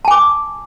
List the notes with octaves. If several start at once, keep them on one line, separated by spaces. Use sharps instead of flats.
G#5 A5 D6